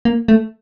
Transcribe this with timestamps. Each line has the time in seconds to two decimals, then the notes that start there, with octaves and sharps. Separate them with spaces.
0.05 A#3
0.28 A3